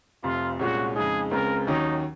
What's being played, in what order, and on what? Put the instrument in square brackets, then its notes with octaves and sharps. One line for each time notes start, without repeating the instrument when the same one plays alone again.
[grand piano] F1 F2 C3 [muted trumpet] F4
[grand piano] C2 A#2 G#3 C#4 F4 [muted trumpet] F#4
[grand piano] F2 C#3 G#3 D#4 [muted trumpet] G#4
[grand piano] C#2 C#3 G#3 C4 [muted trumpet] A#4
[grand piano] D#2 D#3 F#3 C#4 [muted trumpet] D#4